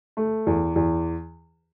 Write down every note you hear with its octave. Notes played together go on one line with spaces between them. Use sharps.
A3
E2
E2